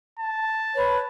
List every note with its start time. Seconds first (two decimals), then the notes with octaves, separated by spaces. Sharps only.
0.19 A5
0.74 B4 C#5